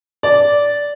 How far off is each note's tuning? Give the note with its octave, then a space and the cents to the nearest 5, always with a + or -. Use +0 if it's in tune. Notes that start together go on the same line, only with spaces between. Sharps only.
D5 -10